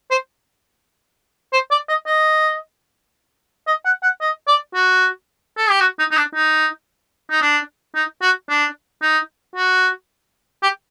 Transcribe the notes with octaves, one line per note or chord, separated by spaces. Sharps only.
C5
C5
D5
D#5
D#5
D#5
F#5
F#5
D#5
D5
F#4
A4
G4
F#4
D#4
D#4
D4
D#4
D#4
D4
D#4
F#4
D4
D#4
F#4
G4